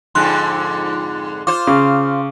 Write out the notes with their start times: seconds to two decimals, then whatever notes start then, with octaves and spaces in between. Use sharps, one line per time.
0.15 F2 G#2 D3 C6 F#6
1.47 F4 C5 D6
1.67 C#3